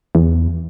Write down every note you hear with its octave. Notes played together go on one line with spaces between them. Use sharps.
E2